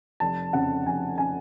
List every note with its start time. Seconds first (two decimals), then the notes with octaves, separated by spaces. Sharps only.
0.20 F1 A5
0.53 F2 C#3 F#5
0.86 F1 G#5
1.18 C#3 G#5